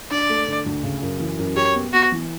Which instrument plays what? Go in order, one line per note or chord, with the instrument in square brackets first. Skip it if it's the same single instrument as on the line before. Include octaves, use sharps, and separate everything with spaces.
[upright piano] D4 [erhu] D5
[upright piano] A3
D3
D2
C#3
F#2
E3
F#2
[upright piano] G4 [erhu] C#5
[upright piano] B3
[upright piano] B3 [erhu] F#4
[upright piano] E3